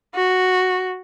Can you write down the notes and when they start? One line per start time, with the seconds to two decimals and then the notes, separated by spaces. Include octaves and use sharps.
0.15 F#4